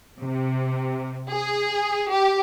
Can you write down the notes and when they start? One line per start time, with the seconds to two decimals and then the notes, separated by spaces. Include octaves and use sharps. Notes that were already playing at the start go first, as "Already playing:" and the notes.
0.22 C3
1.31 G#4
2.10 G4